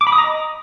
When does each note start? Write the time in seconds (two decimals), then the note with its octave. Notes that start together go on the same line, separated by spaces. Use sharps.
0.01 D6
0.07 B5
0.12 D#6
0.18 A#5
0.24 D#5